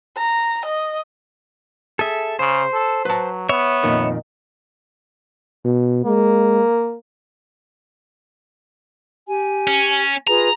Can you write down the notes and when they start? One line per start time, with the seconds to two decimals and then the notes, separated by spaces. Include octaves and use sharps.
0.18 A#5
0.66 D#5
1.99 G#4 A4 E5
2.39 C#3 C5
2.73 A4
3.05 F#3 B4 A5
3.49 B3 C#5 E5
3.83 F2 A#2 D#3
5.65 B2
6.05 G#3 A#3
9.28 G4 G#5
9.67 C#4
10.27 F4 G#4 B4 A#5